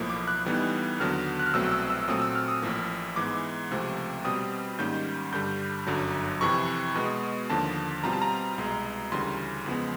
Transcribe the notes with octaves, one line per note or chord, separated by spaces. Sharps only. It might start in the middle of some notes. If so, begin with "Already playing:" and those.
Already playing: B1 A2 F3 A#3
D6
F#6
A2 E3 G3 B3 D#4
D#2 D3 F#3 B3 F6
F#6
F6
C2 B2 F#3 A3 C4 E6
E6
E6
A#2 F#3 A3 C4 D#6
E6
F6
D#6
A1 A2 F3 A#3
G#2 E3 G#3 B3 E4 D6
C#2 C3 F3 A3 C4
B2 G3 C4 D#6
G#2 D#3 G3 A#3 C#4 G6
G2 D3 G3 G6
G1 F#2 D3 F#3
F2 C3 E3 C#6
B2 G#3 B3
D#2 D3 F3 A#3 A5
B2 G3 C4 F4 A#5
A5
A#5
C2 B2 G#3
D2 C#3 E3 G3 C6
E2 C#3 F3 G#3 B3